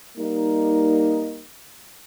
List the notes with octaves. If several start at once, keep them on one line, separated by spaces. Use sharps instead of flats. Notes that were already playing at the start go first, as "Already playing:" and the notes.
G3 A#3 D#4